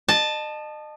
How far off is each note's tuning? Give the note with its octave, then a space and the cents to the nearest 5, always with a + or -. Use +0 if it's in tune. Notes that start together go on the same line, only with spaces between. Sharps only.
D#5 -35 A5 +0